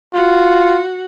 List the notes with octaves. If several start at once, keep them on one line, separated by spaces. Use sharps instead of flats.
F4 F#4